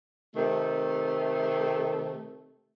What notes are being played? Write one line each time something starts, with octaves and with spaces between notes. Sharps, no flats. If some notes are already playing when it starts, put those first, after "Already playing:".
C3 D#3 A3